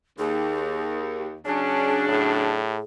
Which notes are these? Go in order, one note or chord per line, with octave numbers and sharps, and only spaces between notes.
D#2 G#4
C#3 F#3 C#4 D4 G#4
A2